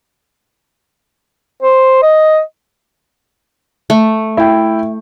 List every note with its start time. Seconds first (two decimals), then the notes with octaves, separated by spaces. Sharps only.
1.63 C5
2.02 D#5
3.90 A3 E5
4.37 E4 G5